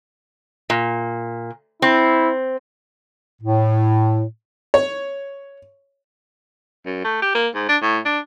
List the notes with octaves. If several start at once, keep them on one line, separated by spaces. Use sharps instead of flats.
A#2
C4 E4
A2
C#5
F#2
A3
G4
A#3
G#2
D4
A2
D4